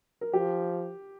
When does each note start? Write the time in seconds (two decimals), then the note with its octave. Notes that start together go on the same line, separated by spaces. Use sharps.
0.21 A#4
0.33 F3 G4